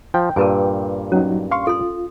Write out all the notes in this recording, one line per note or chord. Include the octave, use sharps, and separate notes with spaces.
F3 G5
G2 A#2 A#4 B4 G#5
F#3 C#4 D#4
F5 C6 C#6
F4 A4 C6